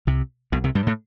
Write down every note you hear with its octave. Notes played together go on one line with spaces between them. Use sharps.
C2 C3
B1 B2
C2 C3
G2 G3
A2 A3